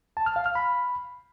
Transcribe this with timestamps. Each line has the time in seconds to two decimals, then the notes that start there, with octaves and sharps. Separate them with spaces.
0.17 A5
0.26 F6
0.36 F5
0.46 F6
0.55 B5